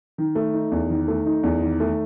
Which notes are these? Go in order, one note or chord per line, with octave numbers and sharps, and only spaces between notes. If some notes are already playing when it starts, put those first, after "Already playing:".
D#3
A3
D#4
E2
D#3
A3
D#4
E2
D#3
A3